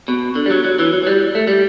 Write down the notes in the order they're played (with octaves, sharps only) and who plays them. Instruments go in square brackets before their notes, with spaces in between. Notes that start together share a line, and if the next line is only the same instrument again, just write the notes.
[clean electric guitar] B2
D3
G3
F#3
F#3
E3
F#3
F#3
G3
A3
G3